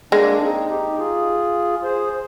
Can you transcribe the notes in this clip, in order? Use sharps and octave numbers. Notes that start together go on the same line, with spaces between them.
G#3 A#3 D4
C4 D#4
D#4 G4
F4 G#4
G#4 C5